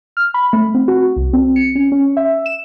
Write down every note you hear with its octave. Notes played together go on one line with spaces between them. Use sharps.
F6
B5
A3
C4
F#4
C2
C4
C#7
C#4
C#4
E5
E7